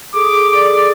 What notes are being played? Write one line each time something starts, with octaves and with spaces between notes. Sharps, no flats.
G#4 A4 D6 D#6
D5